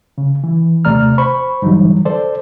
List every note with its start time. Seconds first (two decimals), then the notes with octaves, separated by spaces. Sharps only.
0.18 C#3
0.44 E3
0.85 D#2 C3 A3 D5 A#5 F6
1.18 C5 B5 C#6
1.62 G2 D3 E3 F#3 G3 D#4
2.05 A4 C5 D5